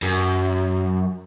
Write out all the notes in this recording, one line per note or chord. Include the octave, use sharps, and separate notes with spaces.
F#2